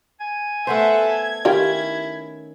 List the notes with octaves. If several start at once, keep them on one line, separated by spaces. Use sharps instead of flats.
G#5
A3 B3 A4 C5 E5 F#5
G#6
D#3 C#4 E4 F4 G4 F5